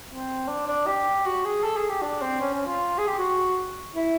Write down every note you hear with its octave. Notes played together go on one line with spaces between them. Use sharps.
C4
D4
D4
G4
F#4
G#4
A4
G#4
G4
D4
C4
C#4
C#4
F4
G#4
G4
F#4
E4